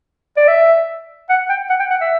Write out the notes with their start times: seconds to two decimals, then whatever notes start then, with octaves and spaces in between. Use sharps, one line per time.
0.37 D5
0.48 E5
1.29 F#5
1.49 G5
1.70 F#5
1.80 G5
1.90 F#5
2.01 E5